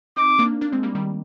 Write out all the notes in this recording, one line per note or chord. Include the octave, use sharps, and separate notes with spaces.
C4 D#4 D6
A#3 D4
A#3 D4
G#3 C4
G3 A#3
D#3 G3